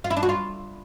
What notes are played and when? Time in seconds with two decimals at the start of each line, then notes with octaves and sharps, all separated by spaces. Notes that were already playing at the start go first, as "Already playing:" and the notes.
0.04 F4
0.10 E4
0.17 D4
0.23 F#4
0.29 F4